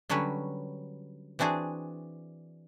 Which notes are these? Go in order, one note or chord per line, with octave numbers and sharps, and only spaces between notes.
D3 F#3 G3 C#4 B4
E3 C4 D4 F#4 G#4